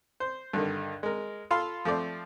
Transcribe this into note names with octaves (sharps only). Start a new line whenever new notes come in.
C5
G2 D3 D#3
G#3 A#4
F4 A4 F5 B5 C6
F3 A3 C4 D5